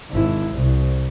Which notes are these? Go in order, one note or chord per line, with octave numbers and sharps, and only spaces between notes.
G#1 E4
C2